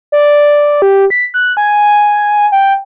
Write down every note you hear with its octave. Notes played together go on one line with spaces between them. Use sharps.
D5
G4
B6
F#6
G#5
G5